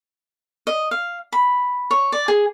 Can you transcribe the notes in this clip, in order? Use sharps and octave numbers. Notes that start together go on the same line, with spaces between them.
D#5
F5
B5
C#5
D5
G#4